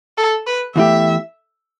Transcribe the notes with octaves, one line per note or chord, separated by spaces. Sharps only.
A4
B4
E2 E3 A3 G4 E5